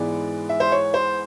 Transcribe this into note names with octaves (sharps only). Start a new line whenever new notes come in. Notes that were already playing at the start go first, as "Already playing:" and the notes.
Already playing: G#2 E3 G#3 B3 D5
E5
C5
C#5
C5